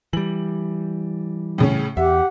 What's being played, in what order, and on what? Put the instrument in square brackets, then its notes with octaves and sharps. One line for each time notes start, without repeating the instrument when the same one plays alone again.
[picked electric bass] E3 G3 [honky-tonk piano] F#7
[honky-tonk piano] A2 C#3 C#4
[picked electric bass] E2 [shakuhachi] G4 [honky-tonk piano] E5 [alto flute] F#5